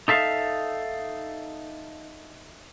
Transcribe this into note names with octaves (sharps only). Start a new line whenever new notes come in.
D#4 A4 E5 F5